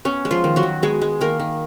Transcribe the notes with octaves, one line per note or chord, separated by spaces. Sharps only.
B3 C#4
G#3
F3 F4
D#3
F#3 F#4
D#3
G#3 B3 G#4
G#3
D#3 A#3 A#4
D#3